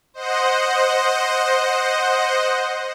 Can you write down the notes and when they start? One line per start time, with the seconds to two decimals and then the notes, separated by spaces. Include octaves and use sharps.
0.14 C5 D#5 F#5